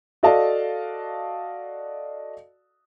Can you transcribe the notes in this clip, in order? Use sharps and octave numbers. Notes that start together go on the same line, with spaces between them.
F#4 A4 D5 D#5 F5 A5